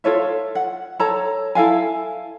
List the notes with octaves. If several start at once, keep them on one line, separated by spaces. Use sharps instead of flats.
F4 A4 C#5 E5
F#5
A4 C#5 A5 A#5
E4 A4 F5 G#5